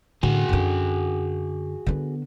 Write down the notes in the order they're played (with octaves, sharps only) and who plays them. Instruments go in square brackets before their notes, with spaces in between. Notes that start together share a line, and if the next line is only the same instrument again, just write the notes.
[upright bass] A2 D3 [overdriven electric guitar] F#4 G#4
[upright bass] F#2 D3
D3 B3